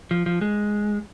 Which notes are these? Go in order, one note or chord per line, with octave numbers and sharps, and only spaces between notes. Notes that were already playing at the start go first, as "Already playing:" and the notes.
F3
F3
G#3